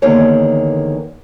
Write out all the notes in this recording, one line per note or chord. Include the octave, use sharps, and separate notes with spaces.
E2 D3 D#3 A#3 G#4 C#5